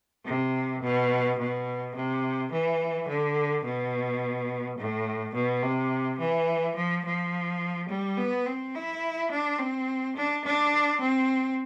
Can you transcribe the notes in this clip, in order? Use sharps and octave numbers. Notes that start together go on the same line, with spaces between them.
C3
B2
B2
C3
E3
D3
B2
A2
B2
C3
E3
F3
F3
G3
B3
C4
E4
D4
C4
D4
D4
C4